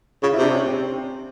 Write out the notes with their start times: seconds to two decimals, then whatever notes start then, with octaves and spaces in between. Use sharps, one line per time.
0.23 C#3 F4
0.33 E4
0.37 C3
0.42 D4
0.53 C#4
0.66 C4